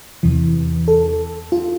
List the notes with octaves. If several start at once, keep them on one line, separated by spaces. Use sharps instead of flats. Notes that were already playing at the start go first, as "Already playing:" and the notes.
E2 C3 E3
A4
F4